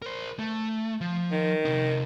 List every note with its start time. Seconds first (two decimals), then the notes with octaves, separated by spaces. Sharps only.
0.02 A#4 C5
0.39 A3
1.01 F3
1.32 D#3
1.65 C3 D#4